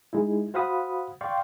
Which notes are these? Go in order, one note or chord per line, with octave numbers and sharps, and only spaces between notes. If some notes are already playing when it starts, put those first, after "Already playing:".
G#3 D#4 E4
F#4 C5 F5 F#5 B5 D#6
D5 F5 G5 C6 C#6